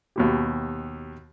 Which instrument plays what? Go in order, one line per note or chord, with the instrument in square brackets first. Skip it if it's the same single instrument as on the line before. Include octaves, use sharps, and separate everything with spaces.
[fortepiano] D#2 B2 G4